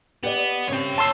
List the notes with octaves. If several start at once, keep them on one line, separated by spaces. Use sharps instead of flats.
B3 G4 D5 D#5
C#3 C4 G4 C#5 G5
A5 C6 E6